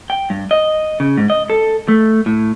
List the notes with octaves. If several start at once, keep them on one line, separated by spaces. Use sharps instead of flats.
G5
G2
D#5
C#3
G#2
D#5
A4
A3
A2